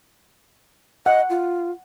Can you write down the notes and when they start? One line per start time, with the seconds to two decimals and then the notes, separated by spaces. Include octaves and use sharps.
1.06 D#5 F#5
1.30 F4